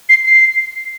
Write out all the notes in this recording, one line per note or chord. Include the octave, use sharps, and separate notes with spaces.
C7
C7